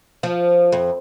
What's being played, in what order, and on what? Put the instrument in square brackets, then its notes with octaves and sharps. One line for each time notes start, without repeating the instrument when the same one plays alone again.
[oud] F3
F2